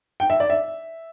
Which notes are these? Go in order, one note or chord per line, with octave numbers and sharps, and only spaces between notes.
G5
E5
D5
E5